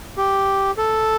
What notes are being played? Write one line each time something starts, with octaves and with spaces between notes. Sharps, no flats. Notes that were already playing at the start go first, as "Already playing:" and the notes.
G4
A4